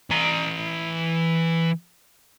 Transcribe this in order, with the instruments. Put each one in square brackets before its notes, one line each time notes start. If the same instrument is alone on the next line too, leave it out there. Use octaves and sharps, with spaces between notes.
[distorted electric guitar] E3 A#5